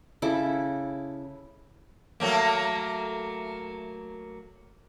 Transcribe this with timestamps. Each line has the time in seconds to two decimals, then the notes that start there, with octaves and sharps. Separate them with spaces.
0.22 C#3 E4 A4 D6
2.20 F#3 A3 A#3